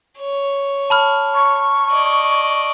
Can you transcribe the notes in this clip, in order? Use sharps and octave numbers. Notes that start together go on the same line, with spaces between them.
C#5
A5 B5 F6
C#6
D5 D#5